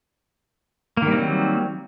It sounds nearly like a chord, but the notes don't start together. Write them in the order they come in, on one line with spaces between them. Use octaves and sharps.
A#3 D#3 G3 C4 F#3